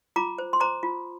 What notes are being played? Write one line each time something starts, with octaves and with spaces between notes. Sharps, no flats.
F4 A#5 D6
C5
C6
C5 A#5 D6
F4